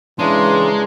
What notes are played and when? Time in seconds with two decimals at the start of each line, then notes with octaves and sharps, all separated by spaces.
0.19 C#3 E3 G#3 D4 A#5 C6